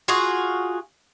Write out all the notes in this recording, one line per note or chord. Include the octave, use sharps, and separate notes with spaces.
F4 F#4 G#4